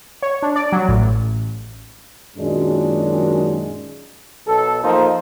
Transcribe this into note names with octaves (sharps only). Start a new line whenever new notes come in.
C#5
D4
D5
F#3
A1
F#2 A#2 D#3 F#3 G#3 D4
B1 A4
F3 A#3 D#4 C5